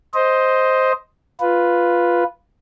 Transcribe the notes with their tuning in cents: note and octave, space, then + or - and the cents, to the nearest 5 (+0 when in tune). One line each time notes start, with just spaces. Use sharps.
C5 +0 D#5 +10
F4 +0 B4 +0